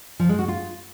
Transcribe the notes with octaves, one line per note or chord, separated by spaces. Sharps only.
F3
G#3
F#4
F4